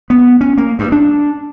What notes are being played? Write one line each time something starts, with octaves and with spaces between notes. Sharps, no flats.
B3
C#4
A#3
G2
D4